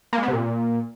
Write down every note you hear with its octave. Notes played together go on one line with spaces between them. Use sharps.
A#3
G#3
B3
C3
A#2